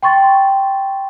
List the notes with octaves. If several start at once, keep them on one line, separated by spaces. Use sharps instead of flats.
G5 C6 C#6 A6